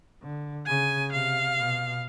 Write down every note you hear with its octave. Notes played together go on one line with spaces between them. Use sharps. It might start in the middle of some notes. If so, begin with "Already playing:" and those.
D3
C#3 G#5
C3 F5
B2